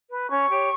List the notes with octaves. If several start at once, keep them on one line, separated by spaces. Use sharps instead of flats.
B4
C#4 C#6
G4 C#5